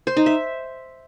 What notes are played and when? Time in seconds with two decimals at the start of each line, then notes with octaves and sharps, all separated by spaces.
0.07 C5
0.17 D#4
0.26 E5